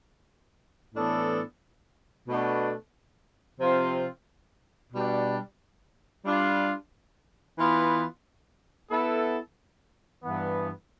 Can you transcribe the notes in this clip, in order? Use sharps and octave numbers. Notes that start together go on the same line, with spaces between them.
A2 E3 B3 D4 A4
B2 A3 D4
C3 F3 C4 F4
B2 G3 D4
G3 D4 F4
E3 B3 F4 B4
B3 E4 A4
G2 E3 B3